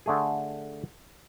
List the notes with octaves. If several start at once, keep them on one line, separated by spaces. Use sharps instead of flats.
D3 A3 G#4